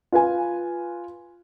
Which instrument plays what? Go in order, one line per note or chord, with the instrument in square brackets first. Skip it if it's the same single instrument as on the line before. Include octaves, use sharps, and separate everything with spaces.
[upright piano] F4 B4 G#5